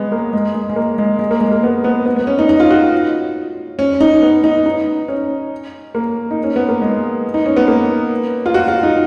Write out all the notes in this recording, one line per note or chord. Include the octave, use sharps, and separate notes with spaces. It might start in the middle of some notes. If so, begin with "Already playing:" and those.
Already playing: G#3 B3
A#3
G#3
G#3
G#3
A#3
G#3
G#3
A#3
G#3
A#3
B3
B3
B3
B3
C#4
D#4
D#4
F4
F#4
C#4
D#4
B3
D#4
D#4
C#4
A#3
D#4
C#4
B3
A#3
G#3
D#4
C#4
B3
A#3
F4
F#4
F4
D#4